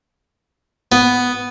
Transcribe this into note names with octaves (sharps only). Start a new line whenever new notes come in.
B3